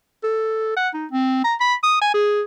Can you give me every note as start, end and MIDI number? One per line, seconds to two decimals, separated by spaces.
0.24 0.74 69
0.77 0.89 78
0.94 1.06 63
1.12 1.44 60
1.44 1.55 82
1.61 1.75 83
1.83 1.97 87
2.02 2.11 80
2.14 2.42 68